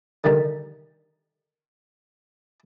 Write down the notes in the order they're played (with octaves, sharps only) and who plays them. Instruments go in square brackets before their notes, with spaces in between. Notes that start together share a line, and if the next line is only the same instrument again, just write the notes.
[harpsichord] D3 D#3 G3 A#4